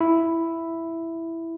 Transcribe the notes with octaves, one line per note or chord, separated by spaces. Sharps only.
E4